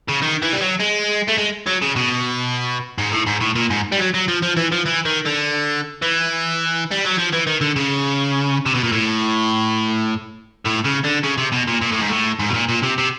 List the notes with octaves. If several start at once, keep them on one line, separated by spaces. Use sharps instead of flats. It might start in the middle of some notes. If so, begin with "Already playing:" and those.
C#3
D#3
E3
G3
F#3
G#3
A3
G#3
F#3
C#3
B2
G#2
A2
G#2
A2
A#2
G#2
G3
F#3
F#3
F3
F3
E3
F3
E3
D#3
D3
E3
G3
F#3
F3
E3
D#3
D3
C#3
C3
B2
A#2
A2
A2
C#3
D3
C#3
C3
B2
A#2
A#2
A2
G#2
A2
G#2
B2
A#2
A#2
C3
C3